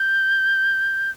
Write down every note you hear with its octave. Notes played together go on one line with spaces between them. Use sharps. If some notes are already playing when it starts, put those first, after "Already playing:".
Already playing: G6